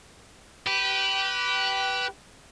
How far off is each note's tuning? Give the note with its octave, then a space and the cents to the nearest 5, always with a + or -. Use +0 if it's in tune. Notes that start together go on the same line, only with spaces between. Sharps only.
G4 -20 B4 +0